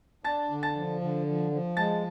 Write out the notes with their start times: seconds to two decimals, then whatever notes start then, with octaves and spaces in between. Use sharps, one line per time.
0.24 D4 A5 A6
0.50 D3
0.63 A5 A6
0.75 F3
1.01 D3
1.27 F3
1.52 F3
1.77 G#3 A5 A6